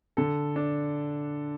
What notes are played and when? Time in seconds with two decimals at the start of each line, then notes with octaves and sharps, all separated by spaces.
0.17 D3 A4
0.56 D4